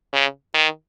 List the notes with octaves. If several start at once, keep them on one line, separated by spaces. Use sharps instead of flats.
C#3
D#3